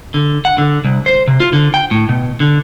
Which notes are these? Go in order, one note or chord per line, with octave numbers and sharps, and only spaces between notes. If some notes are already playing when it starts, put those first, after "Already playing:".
D3
F#5
D3
C2
C5
C3
F4
D3
G5
A2
B2
D3